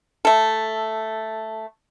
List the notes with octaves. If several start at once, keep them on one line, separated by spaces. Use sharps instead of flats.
A3 A4